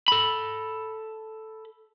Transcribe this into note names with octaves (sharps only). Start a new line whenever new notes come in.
A4 B5